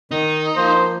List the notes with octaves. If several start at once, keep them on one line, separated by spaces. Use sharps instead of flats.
D#3 D#4
F3 A#3 C5